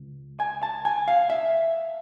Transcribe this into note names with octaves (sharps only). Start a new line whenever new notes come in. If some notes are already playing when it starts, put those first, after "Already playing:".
Already playing: C#2
G#5
A5
G#5
F5
E5